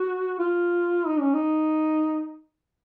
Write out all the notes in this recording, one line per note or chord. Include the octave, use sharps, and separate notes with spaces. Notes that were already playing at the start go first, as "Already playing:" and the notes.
Already playing: F#4
F4
D#4
C#4
D#4